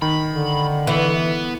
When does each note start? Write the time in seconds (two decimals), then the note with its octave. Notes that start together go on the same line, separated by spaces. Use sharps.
0.02 D#3 B5
0.31 D3
0.87 E3 B3